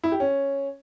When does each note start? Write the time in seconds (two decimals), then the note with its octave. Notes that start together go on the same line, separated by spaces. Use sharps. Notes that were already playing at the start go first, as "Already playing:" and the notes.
0.04 E4
0.12 G4
0.20 C#4